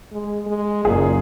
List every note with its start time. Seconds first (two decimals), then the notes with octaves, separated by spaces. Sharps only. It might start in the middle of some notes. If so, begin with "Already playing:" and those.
0.12 G#3
0.47 G#3
0.85 F#1 A#2 G#4